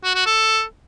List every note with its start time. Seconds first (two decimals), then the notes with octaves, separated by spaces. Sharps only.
0.04 F#4
0.15 F#4
0.26 A4